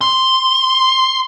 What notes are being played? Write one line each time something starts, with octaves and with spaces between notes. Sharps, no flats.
C6